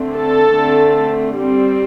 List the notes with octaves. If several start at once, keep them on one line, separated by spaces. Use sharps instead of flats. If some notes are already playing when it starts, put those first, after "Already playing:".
Already playing: D3 A3 C4
A4
D3 A3 C4
G3 C4